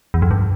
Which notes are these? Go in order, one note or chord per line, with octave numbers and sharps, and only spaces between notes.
E2
F2
G2